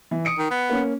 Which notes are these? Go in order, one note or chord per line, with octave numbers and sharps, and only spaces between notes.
E3
D#6 C#7 D7
D#3
B3
A#3 C#4